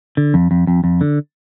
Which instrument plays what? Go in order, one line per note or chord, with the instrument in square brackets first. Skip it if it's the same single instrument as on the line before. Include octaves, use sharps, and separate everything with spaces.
[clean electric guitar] D3
F2
F2
F2
F2
D3